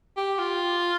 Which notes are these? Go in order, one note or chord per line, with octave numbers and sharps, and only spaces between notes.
G4
F4